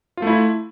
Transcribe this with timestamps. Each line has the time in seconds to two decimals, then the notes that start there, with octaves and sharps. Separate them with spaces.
0.17 F4
0.22 A3
0.27 E4